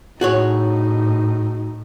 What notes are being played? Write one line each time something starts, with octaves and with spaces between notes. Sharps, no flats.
A2 D#4 F#4 G#4 C#5